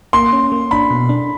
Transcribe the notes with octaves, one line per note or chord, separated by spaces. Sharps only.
A#3 C6
C#4
A#3
D4 B5
B2
D4